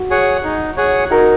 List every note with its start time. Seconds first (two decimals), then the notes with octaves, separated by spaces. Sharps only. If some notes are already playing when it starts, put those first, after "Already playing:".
Already playing: F#4
0.10 G#4 C#5 F#5
0.44 D#4
0.77 G#4 C#5 F#5
1.10 D#4 F#4 A#4